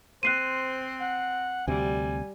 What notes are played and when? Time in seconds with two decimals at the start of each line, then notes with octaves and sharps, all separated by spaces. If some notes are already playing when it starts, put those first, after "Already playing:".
0.23 C4 C5 F#6 C7 D#7
1.01 F#5
1.67 D2 C3 G3 G#5